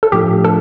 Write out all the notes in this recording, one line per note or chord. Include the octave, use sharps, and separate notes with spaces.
A4
A2 F3 A3 D4 F4 G4
A4